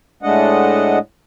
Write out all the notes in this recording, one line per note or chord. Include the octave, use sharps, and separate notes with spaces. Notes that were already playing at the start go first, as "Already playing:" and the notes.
A2 G#3 A3 D4 D#5 F#5